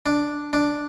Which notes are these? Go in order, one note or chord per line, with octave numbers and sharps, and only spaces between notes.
D4
D4